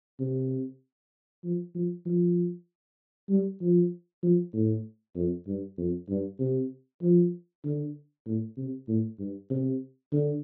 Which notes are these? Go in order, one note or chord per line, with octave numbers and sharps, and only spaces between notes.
C3
F3
F3
F3
G3
F3
F3
A2
F2
G2
F2
G2
C3
F3
D3
A2
C3
A2
G2
C3
D3